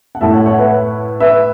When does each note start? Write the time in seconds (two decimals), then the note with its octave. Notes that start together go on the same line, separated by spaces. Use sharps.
0.15 F#5
0.21 A2 A3 E4 E5 A5
0.33 C#5 F#5
0.46 C#5 F#5
0.58 B4 E5
1.20 B4 E5